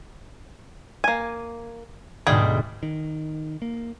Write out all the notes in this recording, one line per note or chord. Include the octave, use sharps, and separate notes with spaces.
A#3 G#5
D2 G#2 B2 G3 G#4 G5
D#3
A#3